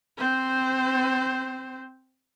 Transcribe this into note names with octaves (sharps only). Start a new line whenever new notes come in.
C4 C5